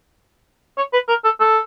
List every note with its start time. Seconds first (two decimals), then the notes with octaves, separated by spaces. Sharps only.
0.77 C#5
0.93 B4
1.08 A#4
1.24 A4
1.40 A4